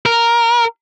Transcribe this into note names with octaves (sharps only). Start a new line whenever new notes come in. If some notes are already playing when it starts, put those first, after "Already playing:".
A#4